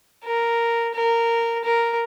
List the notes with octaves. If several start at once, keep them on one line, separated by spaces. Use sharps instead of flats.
A#4
A#4
A#4